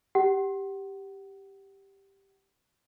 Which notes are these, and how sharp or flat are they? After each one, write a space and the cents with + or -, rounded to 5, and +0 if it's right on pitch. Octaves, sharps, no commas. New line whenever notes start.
G4 +0 F#5 +30